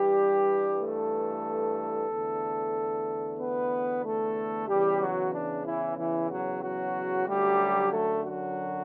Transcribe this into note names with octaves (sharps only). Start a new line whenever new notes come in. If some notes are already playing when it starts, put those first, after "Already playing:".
Already playing: G2 E3 G3 G4
A3 A4
E2 D3 A3
B3 B4
A3 A4
E2 C#3 E3 G3 G4
F#3 F#4
D4
E3 E4
E3 E4
F#3 F#4
F#3 F#4
F#2 D3 F#3 G3 A3 G4
A3 A4
F#3 F#4